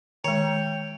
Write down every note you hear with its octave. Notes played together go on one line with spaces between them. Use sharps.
D#3 G#3 C#5 G5